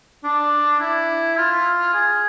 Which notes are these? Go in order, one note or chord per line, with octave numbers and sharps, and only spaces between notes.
D4
E4
F4
G#4